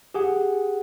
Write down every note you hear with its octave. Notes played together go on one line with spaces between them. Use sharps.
G4 G#4 F#5